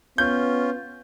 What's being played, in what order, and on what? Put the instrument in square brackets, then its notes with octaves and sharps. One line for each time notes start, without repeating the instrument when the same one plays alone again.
[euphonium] B3 [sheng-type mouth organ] C#4 F4 [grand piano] G6